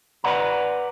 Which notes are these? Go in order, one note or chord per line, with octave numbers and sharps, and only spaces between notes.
B4 C5 D5 F#5 A#5